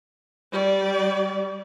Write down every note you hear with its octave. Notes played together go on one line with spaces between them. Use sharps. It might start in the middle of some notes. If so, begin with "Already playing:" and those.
G3 D5